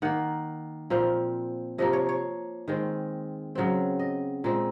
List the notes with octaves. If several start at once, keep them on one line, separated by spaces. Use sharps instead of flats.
D#3 A#3 F#5
A#2 F3 C4 F5
C3 F3 A#3 D#5
C#5
C#5
D#3 G#3 C4
C#3 F#3 C4
D#5
A#2 G#3 C4